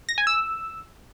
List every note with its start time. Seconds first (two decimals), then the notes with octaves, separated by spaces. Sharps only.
0.09 A#6
0.18 G#5
0.27 E6